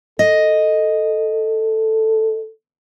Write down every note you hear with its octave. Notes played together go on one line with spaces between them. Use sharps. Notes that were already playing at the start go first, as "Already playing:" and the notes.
A4 D#5